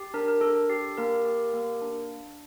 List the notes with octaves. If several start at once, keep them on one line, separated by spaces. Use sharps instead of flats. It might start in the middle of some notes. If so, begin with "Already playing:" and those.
Already playing: G4
D4 A#4
A#4
D4 A4
G4
A#3 A#4
G4
A#3
D4